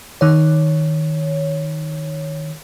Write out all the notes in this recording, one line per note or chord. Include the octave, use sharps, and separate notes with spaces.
D#3 C#5